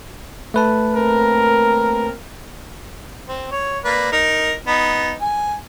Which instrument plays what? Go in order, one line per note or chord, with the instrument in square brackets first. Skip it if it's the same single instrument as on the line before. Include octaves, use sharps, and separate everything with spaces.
[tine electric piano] A3 B4 A5
[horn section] A#3 C4 A#4
[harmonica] C4
C#5
A#3 B4 D5
D#4 A#4
B3 D#4
G#5